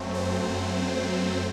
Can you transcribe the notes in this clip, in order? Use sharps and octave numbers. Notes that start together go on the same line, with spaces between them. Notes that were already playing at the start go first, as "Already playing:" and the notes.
Already playing: F#2 F#3 A3 C4
C5